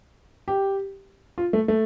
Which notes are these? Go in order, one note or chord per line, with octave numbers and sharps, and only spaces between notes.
G4
F4
A3
A3